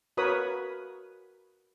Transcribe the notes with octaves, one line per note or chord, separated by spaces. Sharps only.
F#4 A#4 B4 C#5 B5 D#6